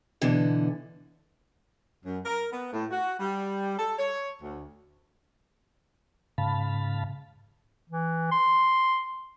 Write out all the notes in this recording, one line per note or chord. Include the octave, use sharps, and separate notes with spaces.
B2 D3 E3 B3
F#2
A#4
B3
A2
F#4
G3
A4
C#5
D2
G#2 C#3 F5 A5 B5
E3
C6